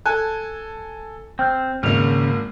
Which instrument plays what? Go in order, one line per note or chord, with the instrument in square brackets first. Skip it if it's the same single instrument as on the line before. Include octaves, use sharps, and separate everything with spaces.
[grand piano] A4 G#5 [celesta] A5 F#6 G#6
[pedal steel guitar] C4 [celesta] G5 F6 G6
[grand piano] G#1 A#3 [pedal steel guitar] C#3 [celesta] F6 F7